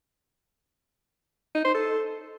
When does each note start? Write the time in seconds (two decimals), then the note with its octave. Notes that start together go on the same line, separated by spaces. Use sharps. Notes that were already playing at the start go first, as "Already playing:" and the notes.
1.55 D#4
1.65 C5
1.74 A4